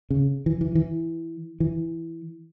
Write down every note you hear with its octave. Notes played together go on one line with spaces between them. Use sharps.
C#3
E3
E3
E3
E3